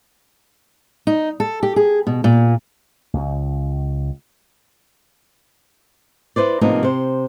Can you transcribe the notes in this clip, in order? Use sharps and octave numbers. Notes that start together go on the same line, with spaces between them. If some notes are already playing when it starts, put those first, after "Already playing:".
D#4
A4
G4
G#4
B2
A#2
C#2
E4 B4 C5 D5
A2 C3 F3 A#3 B3 D#4
C3 C5